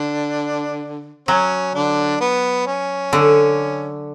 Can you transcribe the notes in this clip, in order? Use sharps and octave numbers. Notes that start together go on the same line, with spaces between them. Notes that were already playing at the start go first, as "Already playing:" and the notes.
Already playing: D3 D4
F#3 C#4
D3 D4
B3
C#4
D3